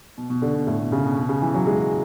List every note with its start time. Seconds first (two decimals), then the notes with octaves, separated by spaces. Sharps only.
0.18 B2
0.30 B2
0.42 D3
0.55 B2
0.67 A2
0.80 B2
0.92 C#3
1.04 B2
1.17 B2
1.29 C#3
1.42 E3
1.54 F#3
1.67 G#3